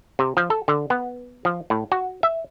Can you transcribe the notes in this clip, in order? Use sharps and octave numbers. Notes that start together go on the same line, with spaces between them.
C3
F3
A4
D3
B3
F3
A2
F#4
E5